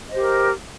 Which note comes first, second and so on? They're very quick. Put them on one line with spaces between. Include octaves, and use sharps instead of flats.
D#5 C5 G4 A#4